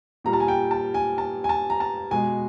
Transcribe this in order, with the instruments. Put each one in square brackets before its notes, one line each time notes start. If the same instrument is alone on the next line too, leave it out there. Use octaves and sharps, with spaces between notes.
[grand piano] A#2 G3 A#5
A5
G#5
G5
A5
G#5
A5
G#5
A5
A#5
A5
B2 G#3 G#5